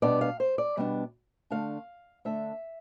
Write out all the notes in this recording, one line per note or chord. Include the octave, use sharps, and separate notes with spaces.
B2 G3 B3 D4 D5
F5
C5
D5
B2 G3 B3 D4
D3 A3 D4 F5
D3 A3 D4 E5